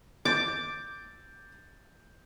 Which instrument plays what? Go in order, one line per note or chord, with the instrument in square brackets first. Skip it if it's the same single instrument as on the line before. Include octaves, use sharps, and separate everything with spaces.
[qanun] D6 [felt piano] G6 A6